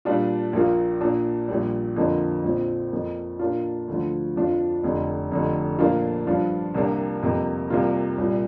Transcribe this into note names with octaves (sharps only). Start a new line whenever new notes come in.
A#2 G3 D4 F4
A#1 A#2 A#3 F4
A#2 A#3 D4
A#1 A#2 G3
F2 D3 F3 A#3 D4
A#1 A#2 F3 C4
F2 F3 A#3
A#2 A#3 D4 F4
D2 D3 F3
F2 F3 D4 F4
F1 F2 D3
F1 F2 D3
A#2 F3 A#3 D4 F4
G2 F3 D4 F4
C2 C3 A#3 D4
G1 F2 C3 A#3
C2 C3 A#3 F4
C2 A#2 G3